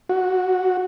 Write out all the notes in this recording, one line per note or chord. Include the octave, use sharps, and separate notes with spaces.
F#4